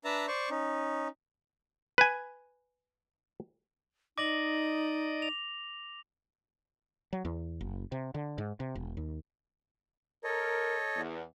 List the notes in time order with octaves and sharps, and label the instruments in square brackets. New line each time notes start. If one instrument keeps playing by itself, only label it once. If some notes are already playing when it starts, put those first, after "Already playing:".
[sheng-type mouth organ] D4 B4 E5 A5 A#5
C5 D5 C#6
C#4 D#4
[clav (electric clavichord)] B4 G#5
[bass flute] D#4 [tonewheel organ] D5 D#5 [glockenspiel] D6 A#6 F#7
[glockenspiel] F7
[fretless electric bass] F#3
E2
F#1
C3
D3
G#2
C3
E1
D#2
[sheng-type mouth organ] A4 C#5 D#5 [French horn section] A#4
[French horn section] E2